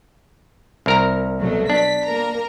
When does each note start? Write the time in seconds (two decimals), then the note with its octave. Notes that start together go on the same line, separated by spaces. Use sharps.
0.86 C2 A#4 A#5
1.39 B2 F#3 A3
1.70 D4 B6
2.05 A#3 A#4 A#5